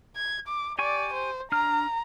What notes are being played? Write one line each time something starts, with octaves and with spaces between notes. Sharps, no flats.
G#6
D6
G4 D5 G#5 C#6
C5
D4 A#5 F6